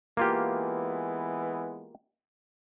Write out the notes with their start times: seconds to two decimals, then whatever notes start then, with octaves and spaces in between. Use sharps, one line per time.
0.17 E3 G#3 A#3 B3 F4 G4